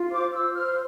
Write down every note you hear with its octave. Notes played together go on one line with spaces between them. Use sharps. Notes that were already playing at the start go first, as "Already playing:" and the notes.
Already playing: F4
C5 D6
C5 E6
C5 F6